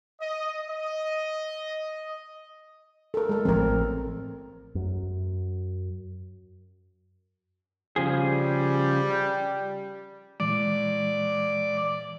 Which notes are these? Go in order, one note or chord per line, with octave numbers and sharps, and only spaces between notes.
D#5
D#5
A4 A#4
G#3 A4
A1 F3 C4 A#4
F#2
C#3 F3 G3 G#4
A#2 E3 G#3 D5